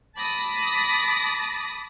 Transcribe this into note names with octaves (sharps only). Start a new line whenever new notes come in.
A5 B5 D6 D#6 A#6